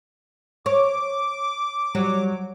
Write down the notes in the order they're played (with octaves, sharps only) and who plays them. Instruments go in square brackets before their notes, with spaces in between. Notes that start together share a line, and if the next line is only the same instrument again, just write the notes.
[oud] C#5 [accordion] D6
[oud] F#3 [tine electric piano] G3